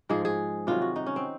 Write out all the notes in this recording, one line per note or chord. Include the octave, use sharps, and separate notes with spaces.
G#2 F3 G#3 G#4
G#4
C3 D#3 F#3 F4
F#4
D#4
C#4
C4